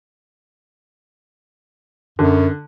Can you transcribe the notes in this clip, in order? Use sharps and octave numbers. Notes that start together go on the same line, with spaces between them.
F#2 D3